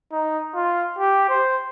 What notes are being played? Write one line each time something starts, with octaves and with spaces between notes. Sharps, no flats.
D#4
F4
G4
C5